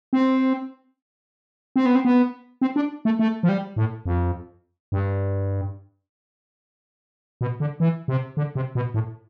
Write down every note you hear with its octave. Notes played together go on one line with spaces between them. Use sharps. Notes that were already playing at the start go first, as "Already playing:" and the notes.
C4
C4
B3
C4
B3
C4
D4
A3
A3
F3
G3
A2
F2
G2
B2
D3
E3
C3
D3
C3
B2
A2